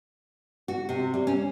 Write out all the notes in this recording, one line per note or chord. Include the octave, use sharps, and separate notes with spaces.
F#4
C3
G3
C#4